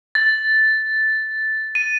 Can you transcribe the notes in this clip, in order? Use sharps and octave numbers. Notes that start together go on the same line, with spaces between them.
A6
D#7